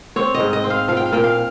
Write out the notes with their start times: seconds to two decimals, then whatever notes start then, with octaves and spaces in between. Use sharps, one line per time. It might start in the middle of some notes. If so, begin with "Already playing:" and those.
0.16 C4 C#5
0.34 D#5
0.40 G#2
0.53 D#5
0.64 C4
0.70 F5
0.88 F3 F5
0.97 G5
1.06 F5
1.12 A#2 G5
1.24 F5